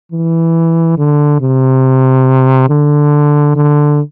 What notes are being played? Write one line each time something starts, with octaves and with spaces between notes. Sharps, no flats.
E3
D3
C3
D3
D3